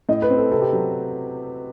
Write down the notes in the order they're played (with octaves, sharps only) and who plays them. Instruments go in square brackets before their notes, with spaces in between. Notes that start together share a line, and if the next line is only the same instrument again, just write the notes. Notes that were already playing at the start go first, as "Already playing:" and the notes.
[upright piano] A2 [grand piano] D#5
[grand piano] B4
[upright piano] C4
[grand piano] A4
[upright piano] C3 [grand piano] A4
[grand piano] G4
[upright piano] F#3